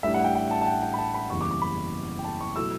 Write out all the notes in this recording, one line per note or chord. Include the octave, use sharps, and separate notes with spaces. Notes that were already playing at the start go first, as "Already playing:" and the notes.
A1 A2 G3 D4 E5
F#5
G5
G5
A5
A5
G5
G5
B5
A5
B5
F#1 E2 C#3 E3 G3 C#6
D6
D6
B5
G5
A5
C#6
B2 F#3 A3 E4 E6